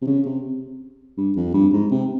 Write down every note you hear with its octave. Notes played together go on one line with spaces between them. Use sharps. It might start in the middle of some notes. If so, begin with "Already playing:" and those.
C3
C#3
C3
G2
F2
G2
G#2
C3